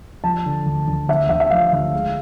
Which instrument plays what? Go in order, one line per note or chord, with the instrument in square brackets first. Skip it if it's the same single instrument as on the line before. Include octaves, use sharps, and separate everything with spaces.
[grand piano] F3 A5
D3
D2
D2
D2 E5
D2 E5
E5
F3 F5
D2
G#3